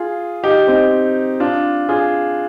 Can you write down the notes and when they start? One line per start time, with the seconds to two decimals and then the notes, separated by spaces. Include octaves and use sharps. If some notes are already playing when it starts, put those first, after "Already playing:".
Already playing: F4 G#4
0.43 D#4 G4
0.67 C4 D#4
1.40 D4 F4
1.89 F4 G#4